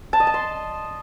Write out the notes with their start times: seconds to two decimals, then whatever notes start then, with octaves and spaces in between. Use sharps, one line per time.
0.13 A5
0.20 D#5
0.27 A5
0.34 C6